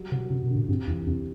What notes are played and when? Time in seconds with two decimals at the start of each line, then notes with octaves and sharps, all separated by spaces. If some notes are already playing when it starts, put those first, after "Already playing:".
Already playing: F#3 G3
0.12 C3 F#3
0.30 F#2 C3
0.43 B2
0.50 D3
0.56 A2
0.69 G2 C3
0.87 E2 E3
1.07 E2 C3